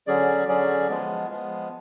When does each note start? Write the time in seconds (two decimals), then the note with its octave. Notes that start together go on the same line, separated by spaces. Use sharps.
0.07 D3 F#3 C#4 G#4 D5
0.48 D3 F#3 C#4 G#4 D5
0.88 F3 G#3 B3
1.29 F3 G#3 B3